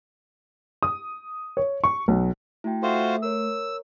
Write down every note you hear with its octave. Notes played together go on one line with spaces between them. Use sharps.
D#6
C#5
C#6
B1
A3 E4 F#4 G5
F4 F#4 A4 C5 E5
A#4 C#5 E6